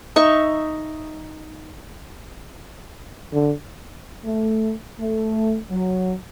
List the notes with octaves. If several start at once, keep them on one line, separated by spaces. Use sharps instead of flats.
D#4 E5 C#6
D3
A3
A3
F#3